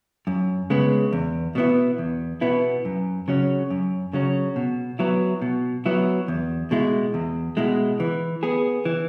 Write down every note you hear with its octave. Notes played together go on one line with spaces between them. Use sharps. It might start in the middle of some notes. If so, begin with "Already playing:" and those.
F#2
C#3 G#3 B3
E2
B2 B3 E4
E2
B2 B3 E4
F#2
C#3 F#3 C#4
F#2
C#3 F#3 C#4
B2
F#3 B3 E4
B2
F#3 B3 E4
E2
B2 G#3 E4
E2
B2 G#3 E4
E3
B3 G#4
E3